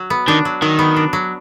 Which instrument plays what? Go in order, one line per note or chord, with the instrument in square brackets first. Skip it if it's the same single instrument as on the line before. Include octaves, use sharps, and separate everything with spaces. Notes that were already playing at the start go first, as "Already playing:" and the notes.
Already playing: [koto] F#3
B3
[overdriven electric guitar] D#3 [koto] D4
[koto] F#3
[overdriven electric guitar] D#3 [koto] F#3
[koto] B3
D4
F#3